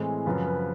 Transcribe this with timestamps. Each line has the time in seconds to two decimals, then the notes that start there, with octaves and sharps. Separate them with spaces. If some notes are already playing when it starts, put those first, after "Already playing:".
Already playing: A2 E3 G#3 C4
0.26 F#2 C#3 F3 B4
0.46 B4